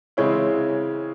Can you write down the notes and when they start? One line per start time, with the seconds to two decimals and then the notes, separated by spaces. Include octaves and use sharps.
0.17 C#3 E3 G#3 C4 E4 C#5